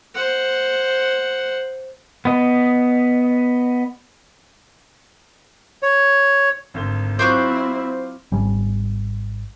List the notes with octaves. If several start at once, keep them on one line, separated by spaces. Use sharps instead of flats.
C5 F#5
B3 D#5
C#5
G#1 D2 G7
F#3 C4 E4 F4 C5 C#6 D6 F#6
G#1 G3 C#4